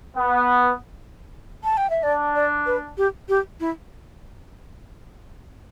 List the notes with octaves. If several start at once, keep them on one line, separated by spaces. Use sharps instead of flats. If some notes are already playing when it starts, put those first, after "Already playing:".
B3 B4
A5
G5
E5
D4 D5
D5
B4
G4
G4
E4